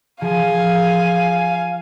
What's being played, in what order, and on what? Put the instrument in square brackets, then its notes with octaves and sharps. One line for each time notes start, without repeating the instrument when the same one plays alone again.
[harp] F3 [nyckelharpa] F4 G#4 [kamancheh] F5 G#5